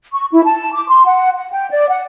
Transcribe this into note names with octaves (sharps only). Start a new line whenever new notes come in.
C#6
E4
A5
D6
C6
F#5
F#5
G5
D5
F#5